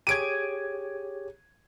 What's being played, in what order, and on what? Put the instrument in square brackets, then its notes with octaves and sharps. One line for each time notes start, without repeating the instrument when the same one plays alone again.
[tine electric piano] G4 G#4 C#5 [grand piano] G#6 D7 D#7